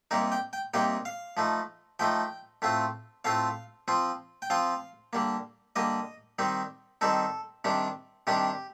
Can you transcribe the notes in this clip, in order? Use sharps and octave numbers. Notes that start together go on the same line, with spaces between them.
C3 G3 A#3 D#4 A#4
G5
G5
C3 G3 A#3 D#4 G5
F5
F3 A3 D#4
F3 A3 D#4 G5
A2 A3 C4 F4
A2 A3 C4 F4 F5
F3 C4 F4
G5
F3 C4 F4 F5
D3 G3 A#3
D3 G3 A#3 D#5
D#3 G3 C4 D#4
D#3 G3 C4 D#4 A4
C3 D#3 G3 D4
C3 D#3 G3 D4 G4